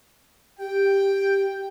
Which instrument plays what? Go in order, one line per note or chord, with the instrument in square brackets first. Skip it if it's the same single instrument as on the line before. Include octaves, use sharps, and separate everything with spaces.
[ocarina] G4 [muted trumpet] G5